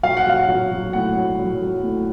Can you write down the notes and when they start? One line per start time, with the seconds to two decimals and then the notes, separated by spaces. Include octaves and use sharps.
0.03 F#3 F5
0.17 F#5
0.27 F#3 F5
0.48 F#3
0.72 F#3
0.93 A2 F#5
1.17 F#3
1.39 F#3
1.62 F#3
1.84 A2